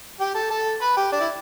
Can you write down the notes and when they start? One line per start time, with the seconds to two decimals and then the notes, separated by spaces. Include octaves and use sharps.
0.20 G4 G5
0.35 A4 A5
0.51 A4 A5
0.81 B4 B5
0.97 G4 G5
1.12 D4 D5
1.20 E4